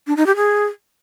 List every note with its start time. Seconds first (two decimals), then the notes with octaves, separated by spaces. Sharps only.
0.07 D4
0.17 D#4
0.26 G4
0.36 G#4